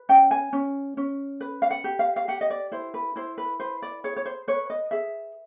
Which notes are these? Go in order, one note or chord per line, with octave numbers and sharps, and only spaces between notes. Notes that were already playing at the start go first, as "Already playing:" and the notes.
Already playing: B4
C#4 G5
G#5
C#4
C#4
B4
F5
F#5
G4
F5
F5
G4 F#5
D#5
D5
E4 C5
B4
E4 C5
B4
B4 C5
D5
G#4 C#5
C#5
C5
B4 C#5
D#5
G#4 E5